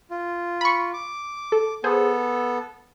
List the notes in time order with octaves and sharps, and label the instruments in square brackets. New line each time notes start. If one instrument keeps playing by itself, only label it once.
[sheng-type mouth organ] F4
[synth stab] B5 C#6
[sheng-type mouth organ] D6
[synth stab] A4
[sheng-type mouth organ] B3 A4 [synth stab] G#4 C5